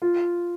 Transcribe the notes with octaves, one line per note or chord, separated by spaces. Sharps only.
F4